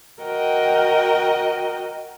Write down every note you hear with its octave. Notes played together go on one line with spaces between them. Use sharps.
F#4 A#4 D#5 G5